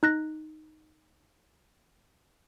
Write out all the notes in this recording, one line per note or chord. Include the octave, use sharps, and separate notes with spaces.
D#4 F#6 A#6